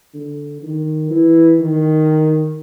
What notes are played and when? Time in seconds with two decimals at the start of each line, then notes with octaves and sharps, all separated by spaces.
0.14 D3
0.62 D#3
1.11 E3
1.60 D#3